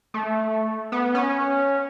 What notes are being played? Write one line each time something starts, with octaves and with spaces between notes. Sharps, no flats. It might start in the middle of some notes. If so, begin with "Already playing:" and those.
A3
B3
C#4